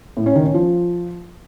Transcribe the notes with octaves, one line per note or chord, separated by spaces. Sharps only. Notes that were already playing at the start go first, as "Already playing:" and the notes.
A2
C#4
D#3
C#4
F3